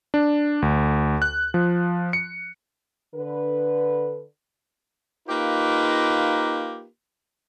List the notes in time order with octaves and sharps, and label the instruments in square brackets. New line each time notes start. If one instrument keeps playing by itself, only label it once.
[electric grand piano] D4
D2
F#6
F3
C#7
[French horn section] D3 B4
[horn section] A#3 D#4 F4 G4 A#4 B4